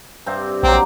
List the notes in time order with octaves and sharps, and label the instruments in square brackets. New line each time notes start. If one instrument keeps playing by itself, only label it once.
[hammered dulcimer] G2 C3 C4
[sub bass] A#1 [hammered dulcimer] F#3 A#3 [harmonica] C4